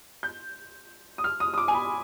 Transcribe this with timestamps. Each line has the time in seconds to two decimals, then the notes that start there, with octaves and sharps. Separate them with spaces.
0.23 G6
1.18 D#6
1.24 F6
1.40 D#6
1.54 D#6
1.58 D6
1.68 G#5
1.74 B5